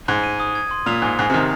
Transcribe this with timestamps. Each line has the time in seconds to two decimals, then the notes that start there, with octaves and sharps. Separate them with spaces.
0.08 G#2 G#6
0.24 D#7
0.40 D#6
0.55 G#6
0.71 C6
0.86 A#2 F7
1.02 G#2 G#5
1.19 G#2 C7
1.30 C3
1.34 D#3 F6